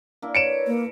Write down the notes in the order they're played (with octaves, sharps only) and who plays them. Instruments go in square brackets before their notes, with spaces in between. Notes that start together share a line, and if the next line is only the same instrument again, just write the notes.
[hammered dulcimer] A#3 D4 E4
[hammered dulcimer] A#4 B4 [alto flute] C#5 [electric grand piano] C#7 D7 E7
[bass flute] A#3